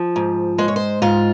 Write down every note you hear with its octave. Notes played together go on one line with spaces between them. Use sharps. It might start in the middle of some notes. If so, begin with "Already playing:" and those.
Already playing: F3
G#2
G#3 C5
C#5
C5
G#2 F4